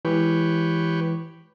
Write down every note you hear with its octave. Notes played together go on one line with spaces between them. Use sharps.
E3 G#3 G4 B4 C#5